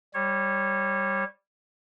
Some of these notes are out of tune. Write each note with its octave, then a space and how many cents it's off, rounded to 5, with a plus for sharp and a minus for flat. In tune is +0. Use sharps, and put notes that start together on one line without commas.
G3 +0 C#5 -25